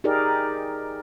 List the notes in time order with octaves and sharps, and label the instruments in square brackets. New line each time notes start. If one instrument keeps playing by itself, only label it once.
[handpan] D#4 G4 G#4 A#4 D5